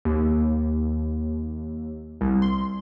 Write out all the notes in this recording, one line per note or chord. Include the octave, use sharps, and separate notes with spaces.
D#2
C2
C6